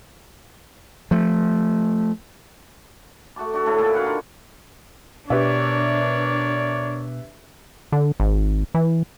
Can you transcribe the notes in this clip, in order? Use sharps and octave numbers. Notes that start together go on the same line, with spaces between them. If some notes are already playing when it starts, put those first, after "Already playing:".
F3 A3
A3 F#4 A5 D6
D4 F#4 A4
A2 D3 E4 A4
A#2 G#4 D5 B5
F#4 B4 F5 F#5
D#3 F4 A#4
B2 D4 G4 A#4 B4 C#5 D5 E5
D3
G#1
E3